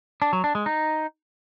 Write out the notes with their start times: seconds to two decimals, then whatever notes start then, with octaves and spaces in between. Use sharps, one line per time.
0.22 D4
0.33 F#3
0.44 D4
0.55 G#3
0.66 D#4